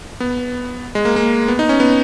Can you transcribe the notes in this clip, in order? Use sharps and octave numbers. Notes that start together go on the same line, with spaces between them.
B3
G#3
A#3
A#3
B3
D#4
C#4
B3